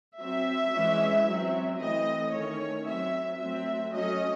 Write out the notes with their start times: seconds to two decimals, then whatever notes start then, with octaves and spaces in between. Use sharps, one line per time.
0.18 F#3 C4 E5
0.72 E3 G#3 C#4
1.26 F#3 C4
1.79 E3 A3 C4 D#5
2.33 D#3 A3 C#4 C#5
2.86 F#3 C4 E5
3.39 F#3 A3 C4 E5
3.92 F#3 A3 C#4 D#5